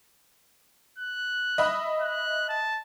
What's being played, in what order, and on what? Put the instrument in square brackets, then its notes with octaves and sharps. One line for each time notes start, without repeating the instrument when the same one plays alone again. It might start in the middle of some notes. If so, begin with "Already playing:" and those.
[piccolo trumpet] F#6
[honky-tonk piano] D#5 E5 B5
[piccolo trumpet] F#6
A5